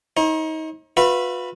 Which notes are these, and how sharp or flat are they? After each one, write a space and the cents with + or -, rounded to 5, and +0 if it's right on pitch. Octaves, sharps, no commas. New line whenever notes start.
D#4 +30 C#5 -45
F#4 -45 B4 +0 E5 +45